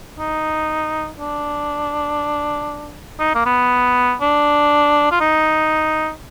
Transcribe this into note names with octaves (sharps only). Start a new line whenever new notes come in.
D#4
D4
D#4
A#3
B3
D4
F4
D#4